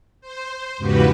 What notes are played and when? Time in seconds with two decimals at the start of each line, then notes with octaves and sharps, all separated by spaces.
0.21 C5
0.77 E2 G#2 C#3 F#4 G4 B4